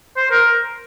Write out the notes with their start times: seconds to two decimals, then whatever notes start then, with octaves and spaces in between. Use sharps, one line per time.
0.17 C5
0.31 A#4